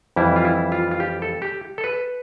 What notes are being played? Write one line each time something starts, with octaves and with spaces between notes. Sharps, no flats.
F2 E3 G3 E4
F4
E4
F4
F4
G4
A4
G4
A4
B4